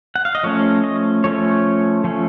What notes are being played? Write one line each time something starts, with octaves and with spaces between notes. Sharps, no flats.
F#5
F5
D#5
F3 A3 C#4 C#5
D#5
F3 A3 C#4 C#5
F3 A3 C#4